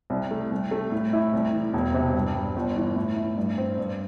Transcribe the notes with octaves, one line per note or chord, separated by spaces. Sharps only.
C2
A3
C2
A3
A2
E4
C2
E3
E1
C3
G2
G3
G1
E3
A2
E4
G2
C4
G2